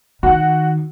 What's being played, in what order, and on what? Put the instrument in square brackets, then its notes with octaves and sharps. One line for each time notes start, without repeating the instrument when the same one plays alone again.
[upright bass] D#3 [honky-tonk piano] F#4 F#5